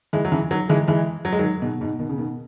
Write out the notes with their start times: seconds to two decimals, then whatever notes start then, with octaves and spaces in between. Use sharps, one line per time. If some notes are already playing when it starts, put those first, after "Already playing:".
0.13 E3 G#3
0.25 F#3
0.32 C#3 E3
0.51 D#3 F#3
0.69 E3 G#3
0.88 E3 G#3
1.25 F#3
1.32 G#3
1.39 D#3 F#3
1.62 G#2 B2
1.81 G#2 B2
1.99 B2 D#3
2.10 C#3
2.18 B2 D#3